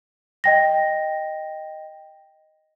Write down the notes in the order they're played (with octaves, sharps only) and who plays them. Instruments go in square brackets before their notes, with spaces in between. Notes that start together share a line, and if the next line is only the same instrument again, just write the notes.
[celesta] D#5 G5 A#6